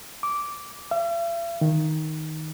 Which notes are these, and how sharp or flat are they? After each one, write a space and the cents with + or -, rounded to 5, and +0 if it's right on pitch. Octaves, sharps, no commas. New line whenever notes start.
D6 -10
E5 +45
D#3 +5